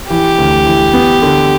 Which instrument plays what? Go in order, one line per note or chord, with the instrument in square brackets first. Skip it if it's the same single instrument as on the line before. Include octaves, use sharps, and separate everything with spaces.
[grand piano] E3 [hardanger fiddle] G4
[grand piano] D2
E3
B3
D3